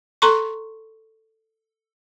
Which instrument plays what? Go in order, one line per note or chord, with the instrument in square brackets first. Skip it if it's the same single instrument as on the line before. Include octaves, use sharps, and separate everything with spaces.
[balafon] A4 A#5 C6 C#6